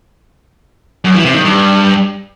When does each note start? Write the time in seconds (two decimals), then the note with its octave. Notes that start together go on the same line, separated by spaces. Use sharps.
1.04 F#2
1.15 E3
1.25 C3
1.35 D#3
1.45 G2